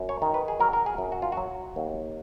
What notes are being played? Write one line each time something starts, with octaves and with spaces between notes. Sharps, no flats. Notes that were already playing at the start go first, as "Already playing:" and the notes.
Already playing: F#2
C#5
D#3
B4
G#4
F#3 A#4
A#4
G#4
F#2
F#4
F4
F#4
F#3
D#2